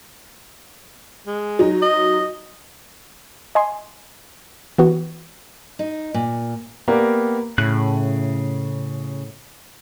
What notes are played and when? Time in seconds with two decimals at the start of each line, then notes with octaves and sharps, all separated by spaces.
1.27 G#3
1.59 F#3 D#4
1.82 D#5
3.55 D#5 G#5 C6
4.78 E3 B3 F#4
5.79 D#4
6.14 A#2
6.88 A#3 B3 G4 A#4 D5
7.58 A2 C#3 F#6